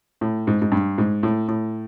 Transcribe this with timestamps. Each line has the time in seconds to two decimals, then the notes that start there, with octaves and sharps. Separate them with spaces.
0.21 A2
0.47 G#2
0.62 G#2
0.72 G2
0.98 G#2
1.23 A2
1.48 A2